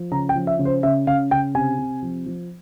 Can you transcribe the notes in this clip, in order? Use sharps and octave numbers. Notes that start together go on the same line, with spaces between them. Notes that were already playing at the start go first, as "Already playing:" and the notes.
Already playing: F3
C#3 A#5
G5
F3
E5
C#3
C5
C#3 E5
C#3 F5
C#3 G5
C3 G#5
C3
F3
F3